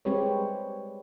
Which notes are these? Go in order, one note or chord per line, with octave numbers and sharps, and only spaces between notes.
G3 G#3 C4 G4 B4 C#5